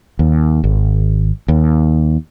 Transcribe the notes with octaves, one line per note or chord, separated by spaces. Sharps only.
D#2
G#1
D#2